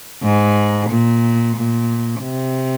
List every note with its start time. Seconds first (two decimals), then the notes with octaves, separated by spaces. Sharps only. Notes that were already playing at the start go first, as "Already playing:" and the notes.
0.22 G#2
0.90 A#2
1.56 A#2
2.23 C3